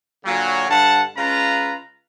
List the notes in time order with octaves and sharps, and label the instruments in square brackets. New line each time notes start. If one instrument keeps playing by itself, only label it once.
[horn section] A#2 D3 F#3
G2 D3 F#5 A5
C#3 G#3 F4 B4 A#5